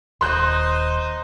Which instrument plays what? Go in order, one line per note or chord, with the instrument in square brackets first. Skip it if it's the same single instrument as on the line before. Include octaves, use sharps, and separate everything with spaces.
[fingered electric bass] D#1 D#2 [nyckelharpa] D#4 C5 [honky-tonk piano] C6 F#6 G6